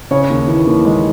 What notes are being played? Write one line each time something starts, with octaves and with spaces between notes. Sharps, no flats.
C#3 C#5
D#2
E3
D#2
G#3